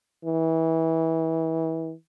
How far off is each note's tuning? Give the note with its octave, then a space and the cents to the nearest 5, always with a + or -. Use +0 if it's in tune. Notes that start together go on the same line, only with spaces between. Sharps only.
E3 -25